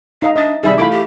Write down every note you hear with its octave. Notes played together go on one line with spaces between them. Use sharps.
D#4 D#5 F5 A#5
D4 D#5 E5 A6
C3 D#3 G3 G#4 E5 B5
E3 A3 E4 F4 B5 D6
G4